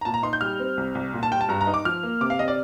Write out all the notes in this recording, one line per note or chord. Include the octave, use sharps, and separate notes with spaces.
A#5
A#2 A5
A#5
D#4 C6
G6
G3 F6
C4
C2
C2
A#2
A5
G3 G5
A5
G2 A#5
A#5
D#4
D6
F3 F6
A#3
C3 D6
F5
C3 D#5
D5